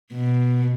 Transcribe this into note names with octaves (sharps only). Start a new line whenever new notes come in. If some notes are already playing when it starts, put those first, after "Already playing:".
B2